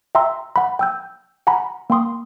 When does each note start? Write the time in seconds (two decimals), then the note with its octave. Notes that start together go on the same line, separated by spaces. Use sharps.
0.15 E5 G5 A#5 C6 E6
0.56 F#5 B5
0.79 G5 E6 G6
1.47 F#5 G#5 A#5 B5
1.90 A#3 G5 C6 D#6